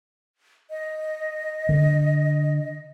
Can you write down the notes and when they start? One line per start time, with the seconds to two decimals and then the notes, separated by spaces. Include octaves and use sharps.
0.70 D#5
1.69 D3